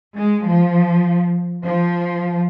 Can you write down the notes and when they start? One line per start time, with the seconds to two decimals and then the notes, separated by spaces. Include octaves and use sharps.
0.16 G#3
0.49 F3
1.64 F3